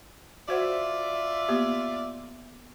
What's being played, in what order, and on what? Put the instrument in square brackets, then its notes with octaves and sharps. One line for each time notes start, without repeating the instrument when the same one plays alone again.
[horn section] F4 D5 E5 [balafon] F#4 C5 F#5
[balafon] A#3 B3 G4